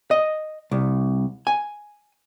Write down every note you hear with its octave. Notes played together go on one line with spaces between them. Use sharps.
D#5
C2
G#5